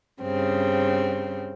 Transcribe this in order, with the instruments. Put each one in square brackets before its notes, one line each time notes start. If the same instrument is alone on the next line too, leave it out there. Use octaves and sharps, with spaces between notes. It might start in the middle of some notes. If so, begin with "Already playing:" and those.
[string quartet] G2 C#3 C4